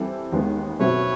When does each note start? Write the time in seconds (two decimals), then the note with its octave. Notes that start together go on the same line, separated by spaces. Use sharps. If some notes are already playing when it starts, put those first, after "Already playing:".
Already playing: E3 G3 C4 E4 A4
0.32 D#2 D#3 G#3 B3
0.80 B2 F#3 A3 C4 B4 C#5